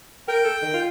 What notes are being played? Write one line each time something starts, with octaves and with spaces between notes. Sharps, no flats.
A#4 G5
A4
D#3
F4